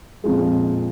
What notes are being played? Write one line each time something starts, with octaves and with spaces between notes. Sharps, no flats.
F2 A#2 F3 G#3